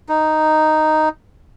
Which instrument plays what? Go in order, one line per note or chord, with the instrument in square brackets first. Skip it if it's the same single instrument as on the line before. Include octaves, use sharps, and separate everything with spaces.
[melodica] D#4